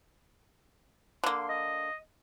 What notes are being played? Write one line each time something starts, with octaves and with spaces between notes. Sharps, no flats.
D3 A#3 C6
D#5